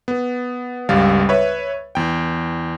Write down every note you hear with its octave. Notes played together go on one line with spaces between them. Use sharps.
B3
G1 C#2 G3 F5 A6
B4 C#5 E5
E2 G5